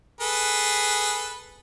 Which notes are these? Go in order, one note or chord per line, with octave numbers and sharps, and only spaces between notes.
G#4 A4 B4